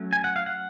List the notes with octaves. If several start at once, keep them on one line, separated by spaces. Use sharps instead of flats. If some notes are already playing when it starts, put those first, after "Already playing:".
Already playing: F#3 A3 C#4
G#5
F#5
F5
F#5